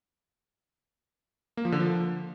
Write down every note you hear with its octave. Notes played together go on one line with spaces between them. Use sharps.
A#3
F3
D3
F3